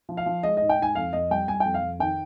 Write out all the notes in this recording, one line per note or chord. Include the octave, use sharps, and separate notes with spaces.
F3
F5
F3
G#3 D#5
G#2 D#5
G5
G#2 G#5
F2 F5
F2 D#5
G3 G5
G3 G#5
G5
F2
F5
F2
D#3 G5